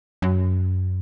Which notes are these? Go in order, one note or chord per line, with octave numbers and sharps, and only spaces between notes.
F#2